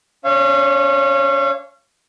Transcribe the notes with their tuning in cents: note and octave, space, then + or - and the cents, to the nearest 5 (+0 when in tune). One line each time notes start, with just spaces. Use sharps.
C#4 +45 C#5 -25 F5 -35